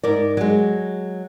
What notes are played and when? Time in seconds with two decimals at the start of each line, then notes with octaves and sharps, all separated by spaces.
0.04 G#2 A#4 D5
0.37 F#3 G#3